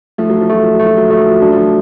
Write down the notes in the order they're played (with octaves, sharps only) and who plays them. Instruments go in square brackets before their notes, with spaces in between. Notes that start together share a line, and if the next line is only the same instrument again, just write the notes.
[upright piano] F3 [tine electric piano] A3
[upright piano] F#3
F3
[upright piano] F#3 [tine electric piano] A3
[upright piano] F3
[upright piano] F#3 [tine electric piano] A3
[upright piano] F3
F#3
[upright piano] F3 [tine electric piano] A3
[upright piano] F#3
F3
[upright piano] F#3 [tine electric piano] D4
[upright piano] F3